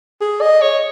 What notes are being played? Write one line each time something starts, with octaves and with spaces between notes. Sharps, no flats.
G#4
D#5
C#5